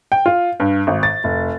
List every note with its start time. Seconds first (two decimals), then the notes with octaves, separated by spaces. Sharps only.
0.12 G5
0.26 F4
0.60 G2
0.87 G#1
1.03 A6
1.24 F1